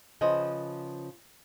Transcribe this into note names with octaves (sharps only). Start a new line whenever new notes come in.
C#3 F3 B4 C5 D#5